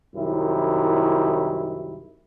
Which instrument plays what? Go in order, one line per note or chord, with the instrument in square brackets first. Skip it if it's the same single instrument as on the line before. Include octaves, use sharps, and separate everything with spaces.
[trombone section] C2 F#2 D#3 E4